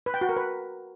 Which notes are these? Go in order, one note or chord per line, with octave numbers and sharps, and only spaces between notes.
B4
G5
F#4
A#4
B4